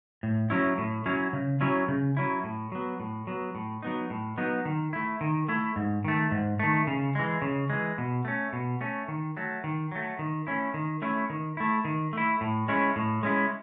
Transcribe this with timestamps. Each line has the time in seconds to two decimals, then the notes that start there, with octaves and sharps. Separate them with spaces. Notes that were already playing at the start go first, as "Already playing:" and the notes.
0.23 A2
0.50 F#3 C#4 E4
0.78 A2
1.06 F#3 C#4 E4
1.33 C#3
1.61 F#3 C#4 E4
1.88 C#3
2.17 F#3 C#4 E4
2.44 A2
2.72 F#3 B3
3.00 A2
3.27 F#3 B3
3.55 A2
3.83 F#3 B3 D#4
4.10 A2
4.38 F#3 B3 D#4
4.65 D#3
4.93 A3 E4
5.21 D#3
5.48 A3 E4
5.76 G#2
6.04 D#3 A3
6.31 G#2
6.59 D#3 A3
6.87 C#3
7.15 E3 G#3
7.42 C#3
7.70 E3 G#3
7.98 B2
8.25 A3 C#4
8.53 B2
8.81 A3 C#4
9.08 D#3
9.37 F#3 A3
9.64 D#3
9.92 F#3 A3
10.19 D#3
10.47 A3 C#4 E4
10.74 D#3
11.02 A3 C#4 E4
11.30 D#3
11.57 A3 E4
11.85 D#3
12.13 A3 E4
12.41 A2
12.68 G#3 C#4 E4
12.96 A2
13.23 G#3 C#4 E4